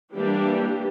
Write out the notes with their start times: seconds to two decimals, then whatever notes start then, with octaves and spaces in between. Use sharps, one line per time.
0.13 E3 G3 A#3 D4 G4